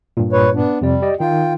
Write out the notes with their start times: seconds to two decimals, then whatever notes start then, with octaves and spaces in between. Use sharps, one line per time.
0.17 G2 A#2
0.33 B4 C#5
0.54 B3 D4
0.81 F2 C3 G3 D5
1.02 G4 D5 D#5
1.20 D#3 D#4 F4 G5